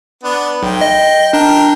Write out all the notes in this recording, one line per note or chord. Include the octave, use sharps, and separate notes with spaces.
B3 D4
B1 G5
D#5
D4 A#4 G5